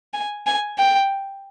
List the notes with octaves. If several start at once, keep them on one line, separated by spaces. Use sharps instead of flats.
G#5
G#5
G5